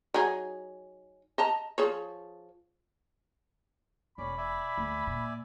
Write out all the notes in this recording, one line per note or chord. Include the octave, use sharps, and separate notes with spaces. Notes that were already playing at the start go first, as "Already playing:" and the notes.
F#3 D#4 G#4
D#5 A5 A#5
F3 G#4 C#5
E1 C#4 D5 B5
D5 E5 G#5
D2
A#2